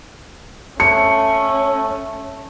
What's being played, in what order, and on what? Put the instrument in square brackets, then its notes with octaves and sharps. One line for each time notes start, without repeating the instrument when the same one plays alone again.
[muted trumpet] A3 [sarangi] C#4 [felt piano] C#7